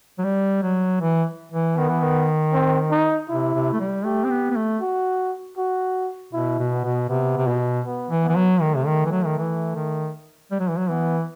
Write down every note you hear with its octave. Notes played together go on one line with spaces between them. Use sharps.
F#3
G3
F#3
E3
E3
D#3 B3
E3
D#3
C4
D#4
C3 E4
C3
A3
G3
A3 G4
C4
B3
B3
A3
F#4
F#4
B2 E4
B2
B3
B2
C3 B3
C3
B2
B3
E3
B3
E3
F#3
D#3 A3
C3
D#3
E3
F#3
D#3
E3
D#3
G3
F#3
E3
F#3
E3 B3